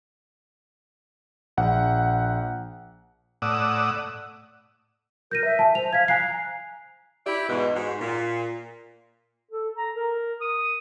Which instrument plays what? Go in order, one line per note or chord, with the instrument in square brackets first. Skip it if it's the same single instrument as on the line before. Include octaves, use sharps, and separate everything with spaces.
[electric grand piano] A#1 F#5
[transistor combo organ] A2 D5 F#5 D#6 E6
[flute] A#4 [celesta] G6 A#6 D#7
[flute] E5
[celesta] G#5 A5
[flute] C5 [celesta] F7
[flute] F5 [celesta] G#6 B6
[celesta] G#5 F#6 C7 [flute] A#5
[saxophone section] E4 G4 D5 E5
E2 G#2 B2
G#2 F#4
A#2
[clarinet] A4
A#5
A#4
D#6